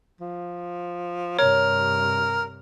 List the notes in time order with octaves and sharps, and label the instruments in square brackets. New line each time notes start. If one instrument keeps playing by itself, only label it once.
[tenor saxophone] F3
[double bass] G2 C3 [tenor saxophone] A#4 [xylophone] C#5